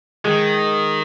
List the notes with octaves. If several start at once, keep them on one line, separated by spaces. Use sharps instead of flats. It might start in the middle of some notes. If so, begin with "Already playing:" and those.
D#3 G#3